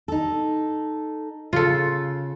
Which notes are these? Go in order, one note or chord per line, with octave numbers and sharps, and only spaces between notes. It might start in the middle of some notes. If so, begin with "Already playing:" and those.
D#4 A4
C#3 F4 A4